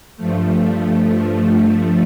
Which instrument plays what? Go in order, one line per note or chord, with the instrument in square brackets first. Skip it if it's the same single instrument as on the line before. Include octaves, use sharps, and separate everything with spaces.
[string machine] G2 F3 A3